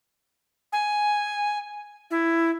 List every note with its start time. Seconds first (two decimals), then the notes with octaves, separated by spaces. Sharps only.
0.73 G#5
2.11 E4